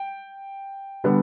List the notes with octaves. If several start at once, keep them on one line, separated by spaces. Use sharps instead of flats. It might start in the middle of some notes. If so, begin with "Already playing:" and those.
Already playing: G5
D3 G3 B3